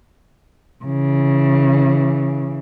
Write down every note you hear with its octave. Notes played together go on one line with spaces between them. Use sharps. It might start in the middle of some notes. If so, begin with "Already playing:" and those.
C#3 E3